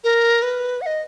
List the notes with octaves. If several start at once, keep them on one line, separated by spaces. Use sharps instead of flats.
A#4
B4
F#5
D#5